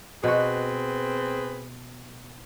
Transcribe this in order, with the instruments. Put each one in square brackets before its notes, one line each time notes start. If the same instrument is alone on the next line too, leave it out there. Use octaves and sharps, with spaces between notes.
[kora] B2 F#4 [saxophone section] C4 G#4 B4